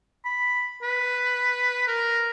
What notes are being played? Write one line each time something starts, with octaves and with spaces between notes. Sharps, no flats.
B5
B4
A#4